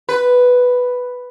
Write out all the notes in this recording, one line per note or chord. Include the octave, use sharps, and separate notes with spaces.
B4